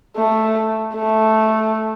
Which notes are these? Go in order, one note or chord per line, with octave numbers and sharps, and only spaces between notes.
A3
A3